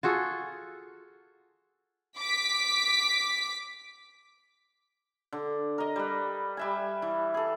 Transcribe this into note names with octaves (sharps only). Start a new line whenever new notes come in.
F4 F#4 G#4 A4
D6 B6
D3
A#4 D#5
G3 B4
G3 E5 G#5
E3
G#4 A4